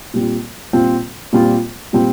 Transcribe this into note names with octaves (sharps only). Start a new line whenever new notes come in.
A#2 G3 C4 F4
A#2 G3 C4 F4
A#2 G3 C4 F4
A#2 G3 C4 F4